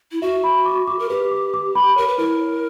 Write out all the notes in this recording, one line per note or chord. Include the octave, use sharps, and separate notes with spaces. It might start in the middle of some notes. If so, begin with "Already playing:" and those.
E4
F#4 E5
B5
D6
D6
A#4
G4 B4
D6
D6
B5
A#4 C#5
B4
E4 A#4
C#5